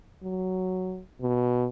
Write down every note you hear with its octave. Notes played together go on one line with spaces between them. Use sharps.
F#3
B2